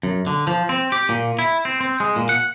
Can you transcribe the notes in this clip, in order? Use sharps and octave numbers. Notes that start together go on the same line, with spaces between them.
F#2
D3
F3
C4
G4
A#2
E4
C4
C4
G#3
A#2
F#5